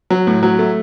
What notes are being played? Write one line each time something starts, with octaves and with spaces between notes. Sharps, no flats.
F#3
A2
F#3
A3